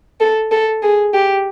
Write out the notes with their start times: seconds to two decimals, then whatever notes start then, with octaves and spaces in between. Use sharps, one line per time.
0.20 A4
0.52 A4
0.83 G#4
1.13 G4